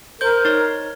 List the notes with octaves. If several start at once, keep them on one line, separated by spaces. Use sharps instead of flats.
A#4 C5 G6
D#4 C#5